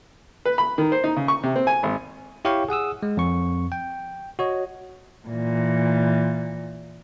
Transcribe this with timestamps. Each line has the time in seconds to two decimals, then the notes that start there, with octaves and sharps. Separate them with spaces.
0.45 B4
0.58 B5
0.78 D#3
0.92 C5
1.04 D#4
1.16 C#3
1.28 C#6
1.43 C3
1.56 C4
1.67 G#5
1.83 G#1
2.45 E4 G4 C#5 F5 G5 C#6
2.69 G#4 F#5 D#6 E6
3.03 G#3
3.17 F2 C#6
3.72 G5
4.39 F#4 C#5 D#5
5.28 A#2 E3